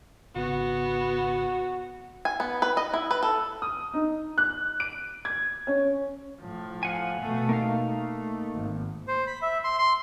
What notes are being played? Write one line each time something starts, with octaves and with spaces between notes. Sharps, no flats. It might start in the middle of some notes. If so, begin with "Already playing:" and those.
G#1 C#3 B3 F#4
G#5
B3
B4
D#5
E4
B4
A4
D#6
D#4
F#6
D7
G#6
C#4
A2 F3
F5 F#5 G#5
B2 A3
A#3 D#4 F5
A3
G#1
C5
B5
E5
C6
C6